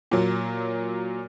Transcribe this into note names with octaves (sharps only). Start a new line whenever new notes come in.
A#2 F#3